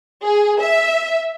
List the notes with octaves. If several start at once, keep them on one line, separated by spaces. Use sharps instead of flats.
G#4
E5